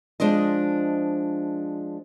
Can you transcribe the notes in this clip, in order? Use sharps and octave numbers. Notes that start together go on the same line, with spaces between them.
F3 G#3 D4 C5 D#5